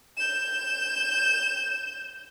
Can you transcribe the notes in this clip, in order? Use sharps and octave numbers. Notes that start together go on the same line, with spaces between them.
G6 E7